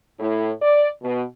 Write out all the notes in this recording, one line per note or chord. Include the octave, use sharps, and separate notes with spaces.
A2
D5
B2